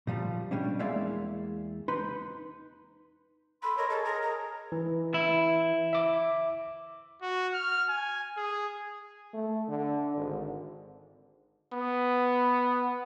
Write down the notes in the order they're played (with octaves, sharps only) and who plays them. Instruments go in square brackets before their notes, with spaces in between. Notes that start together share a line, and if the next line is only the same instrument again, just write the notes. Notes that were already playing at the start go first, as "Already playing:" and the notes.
[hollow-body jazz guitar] A#2 F3 G3
B2 G3 C#4 D4
E2 G#3 A#3 D5 E5 F5
D#4 B4 B5 C6
[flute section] A4 C6 E6 [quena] B5
[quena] A#4 [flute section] C#5 D#5 C#6
[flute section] G#4 D#5 [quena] A4
[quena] A#4
A#5
[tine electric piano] E3
[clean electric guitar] E4
[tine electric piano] E5 D6
[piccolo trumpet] F#4
F6
G#5
G#4
[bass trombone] A3
D3
G#1
[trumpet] B3